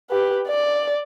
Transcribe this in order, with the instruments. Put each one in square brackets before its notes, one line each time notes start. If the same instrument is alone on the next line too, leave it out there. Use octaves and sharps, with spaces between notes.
[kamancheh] G4 B4
D5